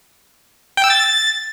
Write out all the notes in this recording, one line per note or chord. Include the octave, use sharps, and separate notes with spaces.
G5
E6
A6